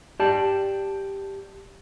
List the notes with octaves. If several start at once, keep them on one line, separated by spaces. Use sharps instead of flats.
G4 D5 A5